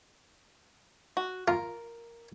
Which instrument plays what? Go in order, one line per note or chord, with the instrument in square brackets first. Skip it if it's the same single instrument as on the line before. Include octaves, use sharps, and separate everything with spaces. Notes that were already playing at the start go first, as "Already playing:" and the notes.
[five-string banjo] F#4
[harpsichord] F4 [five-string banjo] A#4